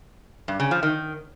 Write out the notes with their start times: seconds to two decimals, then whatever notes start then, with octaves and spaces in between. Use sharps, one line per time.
0.48 G2
0.60 C#3
0.71 F3
0.83 D#3